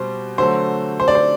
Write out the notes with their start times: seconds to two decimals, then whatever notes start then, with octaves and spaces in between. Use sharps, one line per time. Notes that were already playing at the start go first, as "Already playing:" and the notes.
Already playing: B2 G3 C5
0.38 D3 F#3 A3 C5
1.00 C5
1.08 D5
1.15 C5